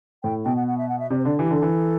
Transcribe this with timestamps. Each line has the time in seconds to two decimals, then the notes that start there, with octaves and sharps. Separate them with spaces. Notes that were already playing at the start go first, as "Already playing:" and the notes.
0.23 A2 G5
0.45 B2 G5
0.56 F#5
0.68 F#5
0.78 E5
0.89 F#5
0.99 E5
1.10 C3 D5
1.18 C5
1.25 D3 D5
1.39 E3 G4
1.51 D3 A4
1.62 E3